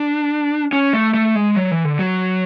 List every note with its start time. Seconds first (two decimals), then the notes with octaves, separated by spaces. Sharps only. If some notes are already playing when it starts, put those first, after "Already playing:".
Already playing: D4
0.73 C#4
0.93 A3
1.14 A3
1.36 G#3
1.56 F#3
1.71 E3
1.85 D3
1.99 F#3